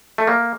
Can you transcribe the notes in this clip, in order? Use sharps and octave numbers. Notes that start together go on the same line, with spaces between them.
A3
A#3